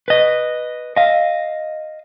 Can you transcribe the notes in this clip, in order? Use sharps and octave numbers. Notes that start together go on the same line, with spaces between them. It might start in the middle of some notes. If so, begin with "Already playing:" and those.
B4 D#5
D#5 F5